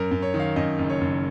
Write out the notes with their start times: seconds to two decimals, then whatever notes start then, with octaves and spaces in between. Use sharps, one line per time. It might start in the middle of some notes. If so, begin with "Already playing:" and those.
Already playing: F#2 A#4
0.11 F#2
0.22 C#5
0.34 D#3
0.40 F5
0.56 F#2 D#5
0.79 F#1
0.89 C#5
1.01 F#1